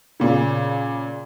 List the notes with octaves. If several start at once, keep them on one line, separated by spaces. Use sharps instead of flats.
A#2 C#3